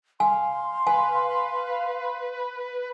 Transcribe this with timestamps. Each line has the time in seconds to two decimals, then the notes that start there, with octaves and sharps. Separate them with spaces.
0.20 F5 G#5 C6
0.87 B4 G#5